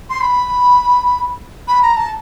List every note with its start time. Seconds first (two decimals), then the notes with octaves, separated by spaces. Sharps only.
0.10 C6
0.21 B5
1.68 B5
1.82 A#5
1.96 A5